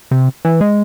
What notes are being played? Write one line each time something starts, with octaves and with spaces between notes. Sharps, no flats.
C3
E3
G#3